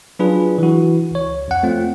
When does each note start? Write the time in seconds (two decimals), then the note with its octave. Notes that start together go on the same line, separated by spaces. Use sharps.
0.19 F#3 D4 F4 G#4 B4
0.58 E3 F#4
1.11 C#2 C#5
1.48 F2 F#5
1.63 A3 C4 F4